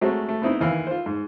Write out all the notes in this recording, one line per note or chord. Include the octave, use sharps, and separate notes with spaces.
F#3 G#3 A3 C4 F#4
A3
B3 C4 D#4 E4
D#2 E3 F5
F4 C5
G#2